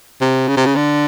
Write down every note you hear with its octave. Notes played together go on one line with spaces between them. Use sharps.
C3
C#3
C3
C#3
D3